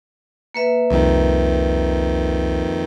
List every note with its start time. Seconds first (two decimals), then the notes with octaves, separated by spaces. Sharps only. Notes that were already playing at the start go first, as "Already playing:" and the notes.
0.54 A#3 B4 E5
0.90 C2 F2 D#3